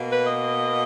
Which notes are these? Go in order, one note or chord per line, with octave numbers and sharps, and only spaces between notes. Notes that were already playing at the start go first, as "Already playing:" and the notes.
Already playing: B2 A#3
B4
D#5